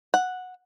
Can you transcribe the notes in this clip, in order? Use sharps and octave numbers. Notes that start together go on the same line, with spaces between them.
F#5